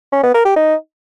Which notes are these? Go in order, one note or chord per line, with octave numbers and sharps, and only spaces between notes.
C#4
B3
A#4
G4
D#4